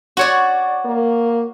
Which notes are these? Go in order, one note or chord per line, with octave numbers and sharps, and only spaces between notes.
F#4 C#5 D5
A#3